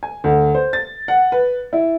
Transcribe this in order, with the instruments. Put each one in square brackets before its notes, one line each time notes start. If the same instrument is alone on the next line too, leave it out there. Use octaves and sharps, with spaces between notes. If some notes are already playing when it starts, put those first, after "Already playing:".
[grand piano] G#5
D2
C5
A6
F#5
B4
E4